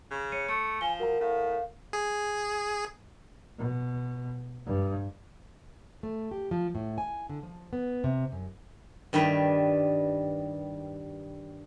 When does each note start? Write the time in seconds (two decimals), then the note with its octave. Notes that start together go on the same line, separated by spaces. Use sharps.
0.11 C#3
0.32 C#5 C#7 D#7
0.48 A3 C#7
0.81 F3 G#5 G7
1.00 F#4 A#4 F#5 A#5
1.20 A2 F5
1.93 G#4
3.59 B2
4.66 G2
6.03 A3
6.31 G4
6.51 F3
6.75 A2
6.98 G#5
7.30 D3
7.43 F3
7.73 B3
8.04 C3
8.32 F#2
9.13 G2 D#3 G3 B4